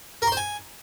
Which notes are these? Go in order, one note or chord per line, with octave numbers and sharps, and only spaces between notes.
A#4
C6
C5
G#5